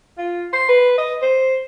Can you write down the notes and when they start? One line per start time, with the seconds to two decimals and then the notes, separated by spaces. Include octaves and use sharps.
0.18 F4
0.53 C6
0.69 B4
0.98 D#5
1.22 C5